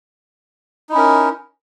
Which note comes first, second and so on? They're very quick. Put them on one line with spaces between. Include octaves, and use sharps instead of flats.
D#4 E4 C#4 A#4